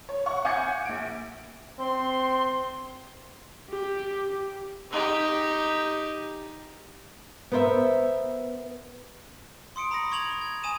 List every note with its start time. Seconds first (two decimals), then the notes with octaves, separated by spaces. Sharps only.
0.09 C#5
0.26 F#5 C#6
0.45 F#5 G#5 D6 G6 G#6 C#7
0.85 A#1 D7
1.78 C4 C6
3.70 G4
4.91 D#4 G4
7.52 B3 A#4 C5 D5 E5
9.76 C6 D#6 C#7 D7
9.91 A#5 B5 D#6 A#6
10.11 C#6 G#6 F7 F#7
10.41 G#6
10.63 G#5 D#6 D#7 E7